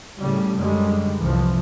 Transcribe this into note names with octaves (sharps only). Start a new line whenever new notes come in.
A2 C#3 G3
F#2 D3 G3 G#3
C2 E3 F3